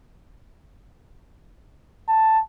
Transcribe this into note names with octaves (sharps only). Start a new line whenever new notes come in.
A5